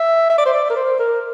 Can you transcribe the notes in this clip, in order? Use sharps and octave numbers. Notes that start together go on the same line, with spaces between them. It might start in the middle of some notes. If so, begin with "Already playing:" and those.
Already playing: E5
E5
D5
C5
D5
A#4
C5
A#4